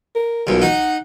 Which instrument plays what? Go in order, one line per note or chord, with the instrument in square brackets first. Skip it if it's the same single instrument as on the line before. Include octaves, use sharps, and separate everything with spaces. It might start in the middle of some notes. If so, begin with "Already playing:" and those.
[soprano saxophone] A#4
[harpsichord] B1 A#2
[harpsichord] D#4 [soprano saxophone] F#5